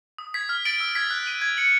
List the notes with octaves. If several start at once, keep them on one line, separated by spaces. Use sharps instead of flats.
D#6
G#6 B6
F6
A6 D7 F#7
E6
G#6 B6
F#6
B6 D#7 F#7
G#6
C#7 F#7